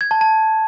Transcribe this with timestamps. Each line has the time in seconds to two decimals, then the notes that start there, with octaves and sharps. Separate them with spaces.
0.01 G#6
0.11 A5
0.21 A5